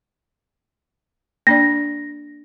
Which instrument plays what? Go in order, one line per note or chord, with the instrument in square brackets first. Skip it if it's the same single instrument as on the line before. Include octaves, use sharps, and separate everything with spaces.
[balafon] A#3 D4 D5 [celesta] A#6